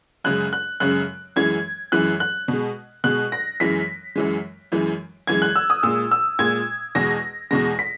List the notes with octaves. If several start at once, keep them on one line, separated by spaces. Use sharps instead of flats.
F#2 C#3 G#3 F#6
F#6
F#2 C#3 G#3 F#6
F#2 E3 G#3 G#6
F#2 E3 G#3 F#6
F#6
B2 G#3
B2 G#3 F#6
A#6
F#2 E3 G#3 B6
F#2 E3 G#3
F#2 E3 G#3
F#2 E3 G#3 G#6
F#6
E6
D#6
A#2 G#3 E6
E6
A#2 G#3 G#6
E2 B2 G#3 A#6
E2 B2 G#3 A#6
B6